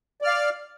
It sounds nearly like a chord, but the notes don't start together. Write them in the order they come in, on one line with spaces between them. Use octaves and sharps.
D5 F6 F5